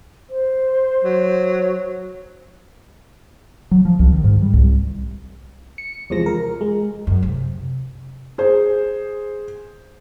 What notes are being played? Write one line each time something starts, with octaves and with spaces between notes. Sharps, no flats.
C5
F#3
F#3
F3
C2
D#3
G#2
G3
C2
C#7
E2 C3 F3 G#3 A#6
A#4
G#3
F#2
C3
G#4 C5